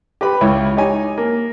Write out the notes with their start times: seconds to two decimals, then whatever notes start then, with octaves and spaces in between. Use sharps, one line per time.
0.21 G4 B4 B5
0.41 C#2 E4 C#5 G5
0.77 D#4 G4 C#5 G#5
1.18 A#3